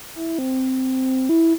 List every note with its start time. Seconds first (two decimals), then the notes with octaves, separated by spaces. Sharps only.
0.15 E4
0.39 C4
1.29 E4